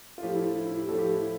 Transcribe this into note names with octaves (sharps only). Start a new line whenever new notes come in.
F4
A2 F3 G4
E4
F4
E4
E4
G4
A2 F3 A4
G4
E4